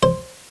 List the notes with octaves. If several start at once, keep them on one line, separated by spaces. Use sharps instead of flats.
C5